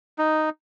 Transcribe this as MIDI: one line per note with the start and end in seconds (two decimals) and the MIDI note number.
0.18 0.50 63